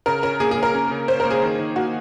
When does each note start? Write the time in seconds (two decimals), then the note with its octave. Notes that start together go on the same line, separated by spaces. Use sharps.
0.06 C#3 A#4
0.23 C#4 A#4
0.40 A#3 G#4
0.51 G#4
0.57 C#3
0.63 A#4
0.74 C#4
0.91 C#3
1.08 C#4 C5
1.20 A#4
1.25 A#3
1.31 G#4
1.42 D#3
1.59 D#3
1.76 A#3 F#4